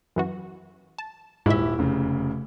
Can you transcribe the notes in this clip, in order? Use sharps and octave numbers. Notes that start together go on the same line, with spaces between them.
F#2 E3 F#4
A5
D#1 G#2 E4 E5
F1 C#3